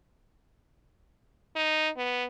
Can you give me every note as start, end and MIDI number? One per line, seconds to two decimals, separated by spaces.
1.56 1.89 63
1.97 2.25 59